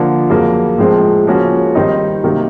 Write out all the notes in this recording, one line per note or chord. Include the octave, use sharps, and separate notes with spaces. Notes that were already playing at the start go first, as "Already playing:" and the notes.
Already playing: D3 F3 A#3
F2 C#3 F#3 A#3
A2 F3 G#3 C4
C#3 F3 A#3 C#4 F#4
D#3 G3 C4 D#4
C3 D#3 F#3 A#3